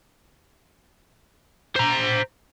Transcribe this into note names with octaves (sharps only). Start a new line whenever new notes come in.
C5 A#5